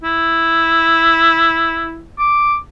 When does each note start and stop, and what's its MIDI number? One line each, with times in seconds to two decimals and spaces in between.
0.04 2.04 64
2.19 2.56 86